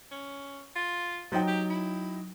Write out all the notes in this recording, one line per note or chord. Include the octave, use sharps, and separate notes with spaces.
C#4
F4
F3 F#3 D#4 G5
G4
E4